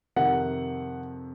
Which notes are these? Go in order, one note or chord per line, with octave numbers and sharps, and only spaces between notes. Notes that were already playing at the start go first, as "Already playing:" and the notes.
F2 C3 D#3 F#5